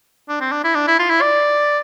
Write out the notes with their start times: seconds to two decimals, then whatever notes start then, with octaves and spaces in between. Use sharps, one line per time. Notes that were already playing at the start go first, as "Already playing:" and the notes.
0.29 D4
0.41 C4
0.51 D4
0.64 E4
0.75 D4
0.87 E4
0.99 F4
1.10 E4
1.21 D5